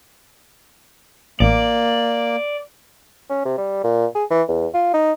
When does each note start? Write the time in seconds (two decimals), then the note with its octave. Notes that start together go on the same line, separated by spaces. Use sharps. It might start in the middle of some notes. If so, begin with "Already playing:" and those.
1.40 A1 A#3 D5
3.30 C#4
3.45 C3
3.58 G3
3.84 A#2
4.15 G#4
4.30 E3
4.49 E2
4.74 F4
4.94 D#4